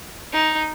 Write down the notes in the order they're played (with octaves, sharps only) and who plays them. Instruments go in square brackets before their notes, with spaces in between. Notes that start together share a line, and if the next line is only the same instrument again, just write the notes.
[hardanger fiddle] D#4